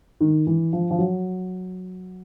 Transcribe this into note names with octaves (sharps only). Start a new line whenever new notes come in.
D#3
E3
F3
F3
F#3